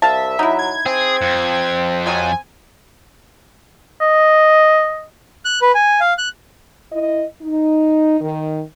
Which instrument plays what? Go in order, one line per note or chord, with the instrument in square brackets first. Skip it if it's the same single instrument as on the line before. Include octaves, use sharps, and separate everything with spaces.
[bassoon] C2 [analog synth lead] E5 [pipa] F5 A5
[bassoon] F#3 [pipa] D#4 E4
[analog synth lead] G#6
[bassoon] C4 [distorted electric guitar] G#4
[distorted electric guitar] F2
[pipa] F#3 G#3 F4 [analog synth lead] G#5
[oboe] D#5
[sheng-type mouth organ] F#6
B4
G#5
F5
F#6
[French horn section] E4 D#5
D#4
D#3